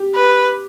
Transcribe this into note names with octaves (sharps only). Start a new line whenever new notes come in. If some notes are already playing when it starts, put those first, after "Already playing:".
Already playing: G4
B4